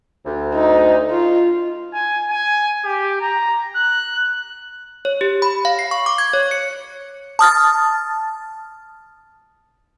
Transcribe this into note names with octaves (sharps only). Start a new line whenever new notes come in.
D2
D#4
F4
G#5
G#5
G4
A#5
F#6
C#5
G4
B5
F5
C7
C#6
D6
G#6
C#5
C#7
A5 D#6 F6 A6